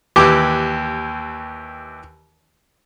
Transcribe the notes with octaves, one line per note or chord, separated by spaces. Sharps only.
D#2 E3 G4 D6